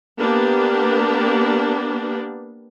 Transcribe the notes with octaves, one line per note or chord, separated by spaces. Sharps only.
A#3 B3 D4 G4